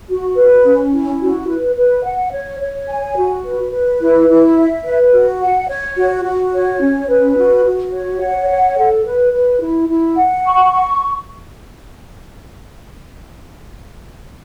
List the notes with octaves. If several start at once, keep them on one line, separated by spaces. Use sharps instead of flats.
F#4
B4
C#4
E4
F#4
B4
B4
F#5
C#5
C#5
G#5
F#4
B4
B4
E4
E4
E5
B4
F#4
F#5
C#5
F#4
F#4
C#5
C#4
B4
F#4
F#4
C#5
F#5
C#5
A4
B4
B4
E4
E4
F#5
C#6